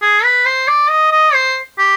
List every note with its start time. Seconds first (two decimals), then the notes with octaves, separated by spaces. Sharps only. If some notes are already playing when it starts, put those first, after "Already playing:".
0.02 G#4
0.24 B4
0.45 C5
0.68 D5
0.89 D#5
1.11 D#5
1.34 C5
1.78 G4